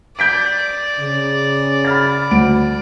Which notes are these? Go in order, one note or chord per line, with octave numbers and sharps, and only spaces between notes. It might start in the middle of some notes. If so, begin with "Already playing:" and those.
D5 G6 B6 D7
C#3
B5 F6 A6
D2 D7